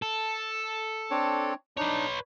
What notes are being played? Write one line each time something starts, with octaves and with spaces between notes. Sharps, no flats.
A4
C4 D4 C#5
D4 D#4 B4 C#5